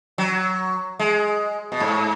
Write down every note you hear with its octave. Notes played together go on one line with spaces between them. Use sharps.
F#3
G#3
B2
G#2